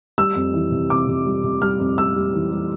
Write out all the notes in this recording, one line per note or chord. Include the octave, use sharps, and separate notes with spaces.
G3 E6
F2
E3
C3
C3 D6
C3
G3
C3
G3 F6
F2
G3 E6
G3
E3
G3